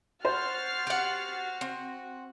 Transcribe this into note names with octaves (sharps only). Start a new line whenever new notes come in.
F#4 C5 F6 A6 C7
G4 F#5
C4